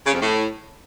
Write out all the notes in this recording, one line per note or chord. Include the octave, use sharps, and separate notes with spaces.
C#3
F2
A2